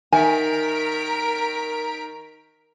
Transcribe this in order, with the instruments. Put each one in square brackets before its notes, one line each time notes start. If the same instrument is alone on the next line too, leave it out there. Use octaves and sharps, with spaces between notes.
[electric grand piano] D#3 [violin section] A#4 B6 D7 [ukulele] E5 G#5